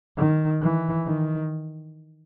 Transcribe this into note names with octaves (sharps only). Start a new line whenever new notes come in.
D#3
E3
D#3